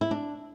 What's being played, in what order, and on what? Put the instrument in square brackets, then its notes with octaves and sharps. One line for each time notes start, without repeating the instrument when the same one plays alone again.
[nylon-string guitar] E4
D4